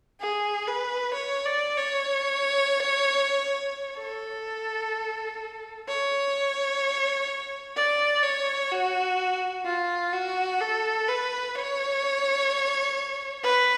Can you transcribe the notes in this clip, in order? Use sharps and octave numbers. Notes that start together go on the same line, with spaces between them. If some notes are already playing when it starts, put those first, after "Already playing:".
G#4
B4
C#5
D5
C#5
A4
C#5
D5
C#5
F#4
F4
F#4
A4
B4
C#5
B4